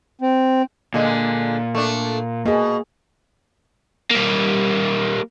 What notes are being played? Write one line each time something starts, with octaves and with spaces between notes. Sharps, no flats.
C4
A#2 D3 G#3
A3 D4
B2 A#3 G#4
G3 A#3